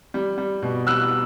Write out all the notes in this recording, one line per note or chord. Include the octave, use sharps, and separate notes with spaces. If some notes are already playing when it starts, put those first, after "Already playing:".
G3
G3
B2
G3 E6 F#6